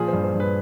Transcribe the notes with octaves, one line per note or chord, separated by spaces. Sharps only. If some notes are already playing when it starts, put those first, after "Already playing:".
Already playing: A#2 F3 G#4
G2 C5
C5
G2
B4